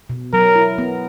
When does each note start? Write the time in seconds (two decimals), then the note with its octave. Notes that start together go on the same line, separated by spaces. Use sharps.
0.10 B2
0.33 F#3 A#4
0.56 E4
0.78 B3